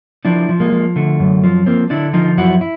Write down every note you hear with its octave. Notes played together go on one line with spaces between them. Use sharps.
F3 D4 E4
F3
G#3 A#3
F3
D3 A3
F#2
F3
F3 A#3 C4
D3 D4 E4
F3 D#4 F4
F#2 E4 F#4
E4